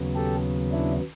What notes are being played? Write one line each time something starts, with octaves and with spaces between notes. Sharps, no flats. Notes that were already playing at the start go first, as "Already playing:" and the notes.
Already playing: D#2 C#3 F#3 B3
G4 A4
D4 E4